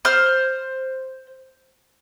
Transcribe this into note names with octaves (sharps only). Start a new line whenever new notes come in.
C5 F6